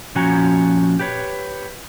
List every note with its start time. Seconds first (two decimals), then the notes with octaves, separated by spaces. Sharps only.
0.15 A#2 F3 C#4 F#4 G#5 A#5
0.99 G4 B4 C#5